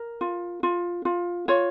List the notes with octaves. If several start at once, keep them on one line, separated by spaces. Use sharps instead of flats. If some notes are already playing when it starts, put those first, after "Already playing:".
Already playing: A#4
F4
F4
F4
F4 C#5